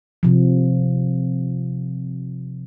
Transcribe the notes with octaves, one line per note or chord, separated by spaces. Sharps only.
C3 F3